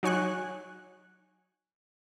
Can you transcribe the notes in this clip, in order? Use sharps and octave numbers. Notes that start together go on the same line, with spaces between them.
F#3 D#4 C#5 G#5 C#6 F#6